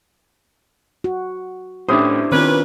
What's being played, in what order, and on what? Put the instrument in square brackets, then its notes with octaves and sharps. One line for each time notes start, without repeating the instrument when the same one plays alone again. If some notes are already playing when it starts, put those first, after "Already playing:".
[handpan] F#4
[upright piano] A2 C#4 D#6 [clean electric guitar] D4 E4 C5 [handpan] G4
[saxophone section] A#2 G3 B4 [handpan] D#3 C4 F4 [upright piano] C#4